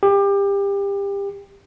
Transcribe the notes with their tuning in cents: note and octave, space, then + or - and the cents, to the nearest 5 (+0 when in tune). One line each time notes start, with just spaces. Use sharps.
G4 +25